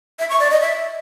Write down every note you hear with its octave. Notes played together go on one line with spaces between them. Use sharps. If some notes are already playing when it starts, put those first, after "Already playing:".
E5
C#6
D5
D#5
E5